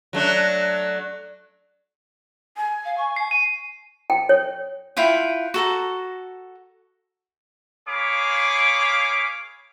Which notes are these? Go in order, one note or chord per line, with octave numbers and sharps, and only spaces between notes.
F#3 A3 D4
G#5
F5
C#6
C7
D#7
G5
C#5
E4 F4 F#5 G5
F#4 A4 A#5
A#3 G#4 C#5 F5 B5 D6